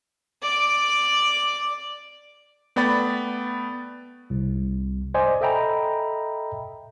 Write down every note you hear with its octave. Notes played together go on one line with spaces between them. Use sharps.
D5 D6
A3 B3 D5 G5 B5 A6
C2
C5 D5 D#5 G#5
A4 D#5 E5 G5 A#5 B5